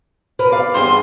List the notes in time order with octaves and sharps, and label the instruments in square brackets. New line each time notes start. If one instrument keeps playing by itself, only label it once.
[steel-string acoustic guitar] A#4 B4
D5 F5
[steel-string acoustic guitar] E2 G2 G#4 [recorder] C6